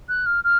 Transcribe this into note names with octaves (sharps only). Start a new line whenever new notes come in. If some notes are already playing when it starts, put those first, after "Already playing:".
F#6
F6
F6